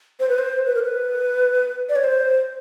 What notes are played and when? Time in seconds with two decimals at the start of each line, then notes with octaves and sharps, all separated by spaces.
0.20 C5
0.29 B4
0.39 C5
0.66 B4
0.75 A#4
0.83 B4
1.89 D5
1.96 C#5
2.04 C5